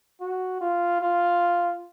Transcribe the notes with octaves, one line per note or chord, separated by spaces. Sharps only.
F#4
F4
F4